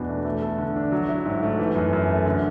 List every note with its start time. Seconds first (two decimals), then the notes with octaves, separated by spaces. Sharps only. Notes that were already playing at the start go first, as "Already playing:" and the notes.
Already playing: E2 B2 D4
0.09 A3
0.25 A3
0.42 A4
0.58 D3
0.76 D4
0.92 F#3
1.09 E4
1.26 G#2
1.43 A3
1.60 E3
1.76 F#2
1.93 F#2
2.09 A3
2.26 D3